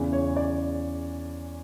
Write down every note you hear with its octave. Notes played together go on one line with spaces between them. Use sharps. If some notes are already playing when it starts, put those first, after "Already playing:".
Already playing: E2 C#3 E3
C#5
D5